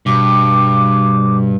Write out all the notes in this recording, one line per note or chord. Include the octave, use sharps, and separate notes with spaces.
G2 B2 D6